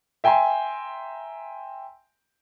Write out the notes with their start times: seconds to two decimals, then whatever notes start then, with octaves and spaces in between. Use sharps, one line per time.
0.24 E5 G5 G#5 A#5 C6